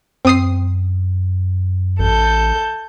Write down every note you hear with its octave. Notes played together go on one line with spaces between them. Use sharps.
F#2 C4 D#6 C7
A1 A4 G6